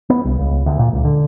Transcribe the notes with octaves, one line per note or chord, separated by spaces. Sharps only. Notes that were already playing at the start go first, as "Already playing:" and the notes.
B3
C2
C#2
D2
A#2
C#2
D3